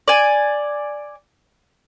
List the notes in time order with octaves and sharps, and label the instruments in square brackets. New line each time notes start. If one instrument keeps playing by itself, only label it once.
[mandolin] D5 G#5